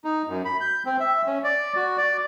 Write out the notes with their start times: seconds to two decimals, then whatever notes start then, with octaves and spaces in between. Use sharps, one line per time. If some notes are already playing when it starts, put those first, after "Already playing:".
0.04 D#4
0.27 F#2
0.45 B5
0.61 G6
0.86 C4
1.00 E5
1.27 C#4
1.44 D5
1.76 F#4
1.97 D5